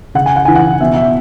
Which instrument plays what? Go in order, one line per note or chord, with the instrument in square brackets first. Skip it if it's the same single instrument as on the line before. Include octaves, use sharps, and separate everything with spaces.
[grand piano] C#3 F#5
G#5
F#5
E3 G#5
F#5
B2 E5
E5